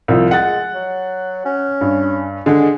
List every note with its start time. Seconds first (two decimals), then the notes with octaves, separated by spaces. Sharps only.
0.08 C2 F3
0.31 G#3 F#5 A6
0.74 F#3
1.46 C#4
1.81 G2
2.46 D3 G#3